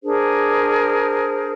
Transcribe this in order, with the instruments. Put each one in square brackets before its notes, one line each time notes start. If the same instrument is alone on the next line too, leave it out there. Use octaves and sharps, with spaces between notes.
[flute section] D4 G#4 A#4 C5